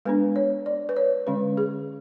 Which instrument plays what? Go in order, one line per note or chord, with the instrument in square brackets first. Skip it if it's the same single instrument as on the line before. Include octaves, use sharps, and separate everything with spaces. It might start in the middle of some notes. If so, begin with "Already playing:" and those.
[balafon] G#3 B3 D4 B4
C#5
D5
B4
C#5
D3 G#3 C#4 B4
G#4